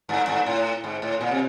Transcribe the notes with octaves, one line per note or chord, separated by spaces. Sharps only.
G2
G2
A2
G#2
A2
A#2
C3